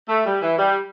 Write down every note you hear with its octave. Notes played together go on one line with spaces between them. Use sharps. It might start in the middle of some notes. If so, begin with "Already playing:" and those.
A3
G3
E3
G3